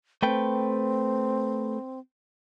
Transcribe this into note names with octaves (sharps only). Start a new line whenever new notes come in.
A3 C4 B4 G5